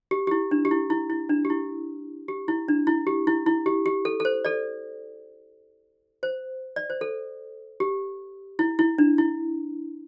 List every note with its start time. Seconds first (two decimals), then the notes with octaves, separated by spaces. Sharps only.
0.11 G4
0.27 G4
0.31 E4
0.51 D4
0.65 G4
0.71 E4
0.90 E4
1.10 E4
1.29 D4
1.45 G4
1.50 E4
2.28 G4
2.48 E4
2.68 D4
2.87 E4
3.07 G4
3.27 E4
3.46 E4
3.66 G4
3.86 G4
4.05 A4
4.20 A4
4.25 C5
4.45 A4 D5
6.23 C5
6.76 D5
6.90 C5
7.01 A4
7.80 G4
8.59 E4
8.79 E4
8.98 D4
9.18 E4